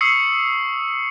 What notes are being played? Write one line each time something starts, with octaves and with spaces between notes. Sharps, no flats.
C#6 D#6 E6 C7 C#7